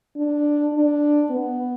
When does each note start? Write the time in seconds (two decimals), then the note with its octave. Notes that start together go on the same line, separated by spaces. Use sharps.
0.17 D4
0.74 D4
1.30 B3